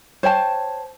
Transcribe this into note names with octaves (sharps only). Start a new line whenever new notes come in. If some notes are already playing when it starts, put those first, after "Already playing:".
C5 C#5 G5 A5